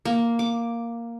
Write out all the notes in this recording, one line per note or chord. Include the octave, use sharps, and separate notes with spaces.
A#3
D6